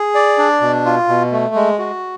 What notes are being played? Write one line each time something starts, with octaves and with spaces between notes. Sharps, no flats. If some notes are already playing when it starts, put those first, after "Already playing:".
Already playing: G#4
D5
D4
B2
F4
B2
A3
G#3
F#4